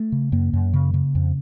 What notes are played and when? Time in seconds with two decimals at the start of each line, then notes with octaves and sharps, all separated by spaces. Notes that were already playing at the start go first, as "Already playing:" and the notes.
Already playing: A3
0.12 C#3
0.32 F#2 A#3
0.53 F#2
0.73 C#3
0.94 C#3
1.15 F2